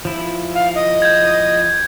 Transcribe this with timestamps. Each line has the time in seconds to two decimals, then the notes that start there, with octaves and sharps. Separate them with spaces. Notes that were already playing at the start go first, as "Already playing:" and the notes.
0.05 F3 E4
0.55 F5
0.75 D#5
1.02 G6 G#6